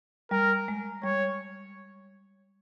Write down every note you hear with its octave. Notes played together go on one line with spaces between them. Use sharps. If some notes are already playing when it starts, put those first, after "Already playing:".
G3 A#4
G#3
G3 C#5